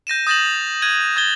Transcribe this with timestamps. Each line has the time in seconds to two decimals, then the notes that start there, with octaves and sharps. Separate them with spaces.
0.07 G6 A#6 D#7 E7
0.27 D#6 G6 A6 A#6 E7 F#7
0.82 F#6 G#6 D#7 F#7
1.16 D#6 G#6 A6 G7